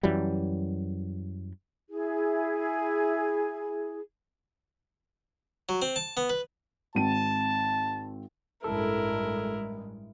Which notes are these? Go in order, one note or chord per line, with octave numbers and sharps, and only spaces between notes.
F#2 E3 F#3 G3
E4 G#4
F#3
C4
A5
B3
B4
G#1 C4 A5 D#7
A1 G2 G#3 E4 A4 A#4